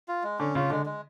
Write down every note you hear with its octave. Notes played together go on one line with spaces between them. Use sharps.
F4
G#3
D3 C#4
C#3 F4
D3 G#3
G#3